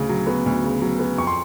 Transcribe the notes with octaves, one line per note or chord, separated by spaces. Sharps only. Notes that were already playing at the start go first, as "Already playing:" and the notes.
Already playing: D2 C#3
F#3
B3
D2
C#3
F#3
B3
F2 C#6
C6